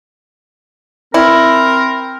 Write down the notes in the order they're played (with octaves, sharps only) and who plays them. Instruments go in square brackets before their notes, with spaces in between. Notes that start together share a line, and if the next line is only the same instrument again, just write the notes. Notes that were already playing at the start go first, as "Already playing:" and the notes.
[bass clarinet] C4 [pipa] E4 [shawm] A#4